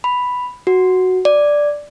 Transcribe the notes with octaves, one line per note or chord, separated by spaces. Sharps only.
B5
F#4
D5